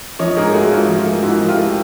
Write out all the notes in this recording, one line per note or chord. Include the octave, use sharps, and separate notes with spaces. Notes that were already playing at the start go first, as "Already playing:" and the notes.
F3 C#5 D#5
G#2 G#4 A#4
A3 F#4 G#4
G#2 F4
F3
F4
A3
G#2 E4 F#4
F3
F4 G4
A3